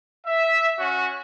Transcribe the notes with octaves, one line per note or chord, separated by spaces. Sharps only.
E5
C#4 F#4